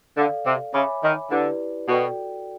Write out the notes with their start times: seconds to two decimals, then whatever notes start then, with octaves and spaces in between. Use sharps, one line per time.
0.17 D3 A4 D5 F5
0.46 C3
0.74 C#3 C#5 E5 G#5 B5 D6
1.03 D#3
1.31 D3 E4 G4 B4 D5
1.88 B2 F#4 A4 D5 G5